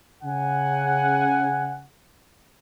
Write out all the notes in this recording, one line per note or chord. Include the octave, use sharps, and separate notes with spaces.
C#3 F#5 G#5